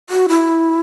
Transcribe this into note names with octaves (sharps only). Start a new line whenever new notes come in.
F#4
E4